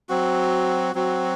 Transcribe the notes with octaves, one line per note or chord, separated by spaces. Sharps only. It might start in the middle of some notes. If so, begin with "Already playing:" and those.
F#3 C4 F#4
F#3 C4 F#4